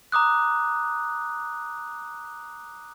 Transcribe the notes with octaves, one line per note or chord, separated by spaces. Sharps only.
A#5 D6 D#6 F#6